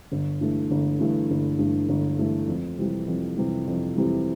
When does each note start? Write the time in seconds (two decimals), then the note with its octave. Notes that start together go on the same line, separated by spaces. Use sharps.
0.12 G1
0.41 G2 E3 A3
0.71 G1
1.00 G2 E3 A3
1.30 G1
1.59 G2 E3 A3
1.89 G1
2.19 G2 E3 A3
2.48 F2
2.78 C3 E3 G3
3.08 F2
3.37 C3 E3 G3
3.67 F2
3.96 C3 E3 G3